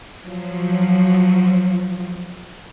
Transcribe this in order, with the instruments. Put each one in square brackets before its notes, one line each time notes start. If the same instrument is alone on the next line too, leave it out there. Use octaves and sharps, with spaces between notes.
[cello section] F3 F#3